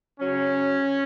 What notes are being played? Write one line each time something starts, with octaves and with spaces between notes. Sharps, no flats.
C#3 F#3 C#4